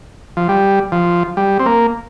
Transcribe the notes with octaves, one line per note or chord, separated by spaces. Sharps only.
F3
G3
F3
G3
C4
A#3